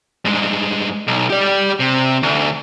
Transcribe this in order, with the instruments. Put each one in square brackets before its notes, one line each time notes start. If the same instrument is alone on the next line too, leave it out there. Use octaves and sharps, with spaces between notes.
[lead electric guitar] G2 G#3
B1
G4 D5
C3
D2